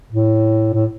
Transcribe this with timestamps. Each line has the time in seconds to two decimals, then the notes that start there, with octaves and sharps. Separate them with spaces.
0.12 A2
0.74 A2